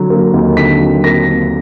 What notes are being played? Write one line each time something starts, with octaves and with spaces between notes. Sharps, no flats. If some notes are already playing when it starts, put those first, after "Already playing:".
Already playing: D3 F#3
A#3
D#2
D3 B6
F#3
A#3 A#6
D#2